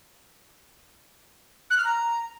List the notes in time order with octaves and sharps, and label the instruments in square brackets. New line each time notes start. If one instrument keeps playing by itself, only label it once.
[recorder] F#6
F6
A#5